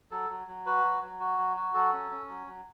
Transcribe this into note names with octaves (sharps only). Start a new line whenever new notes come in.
F#3 A4
F#3
F#3
F#4 B4
F#3
F#3
F#4
F#3
F#4
F#3 A4
C#4
C#4
F#3
F#3